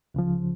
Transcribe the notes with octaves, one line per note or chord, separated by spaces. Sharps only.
C#2 C#3 F3